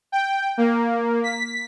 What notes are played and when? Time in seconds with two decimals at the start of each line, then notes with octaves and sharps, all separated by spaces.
0.12 G5
0.58 A#3
1.24 B6